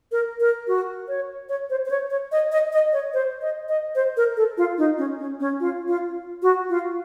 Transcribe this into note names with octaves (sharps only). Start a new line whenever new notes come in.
A#4
A#4
F#4
C#5
C#5
C5
C5
C#5
C#5
D#5
D#5
D#5
C#5
C5
D#5
D#5
C5
A#4
A4
F4
D#4
C#4
C#4
C#4
F4
F4
F#4
F4